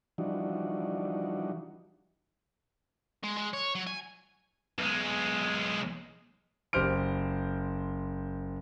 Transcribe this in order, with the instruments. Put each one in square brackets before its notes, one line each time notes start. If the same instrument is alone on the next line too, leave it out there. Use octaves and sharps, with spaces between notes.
[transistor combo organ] E3 F3 G3 D4 D#4 F#4
[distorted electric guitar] G#3
G#3
C#5
F#3
G#5
B1 G#3
[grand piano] F#1 G4 C5 F6 D7